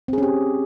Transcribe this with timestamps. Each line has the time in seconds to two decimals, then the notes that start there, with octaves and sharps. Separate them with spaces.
0.08 C4
0.13 G#4
0.18 C#4
0.23 G4